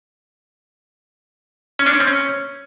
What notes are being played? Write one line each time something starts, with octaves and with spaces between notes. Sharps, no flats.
C#4
D4
C#4
C4
C#4